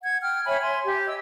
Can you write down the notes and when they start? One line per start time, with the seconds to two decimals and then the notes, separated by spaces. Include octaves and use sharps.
0.03 F#5 G#6
0.22 G5 F6
0.46 C#5 E5 G#5 B5
0.62 E5 G#5 C6
0.85 G4
1.07 D#5 E6